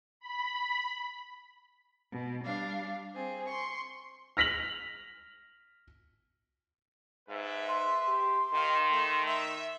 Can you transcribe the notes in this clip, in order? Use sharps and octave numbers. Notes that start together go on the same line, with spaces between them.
B5
B2
G3 D4 F5
C4 G#4
C6 C#6
F6 A#6 B6 F7 F#7
G#2 B4 E5
C6
G4
D#3 D#4 G4 F5
A3
E5